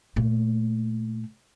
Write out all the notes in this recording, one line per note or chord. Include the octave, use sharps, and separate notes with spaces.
A#2 A3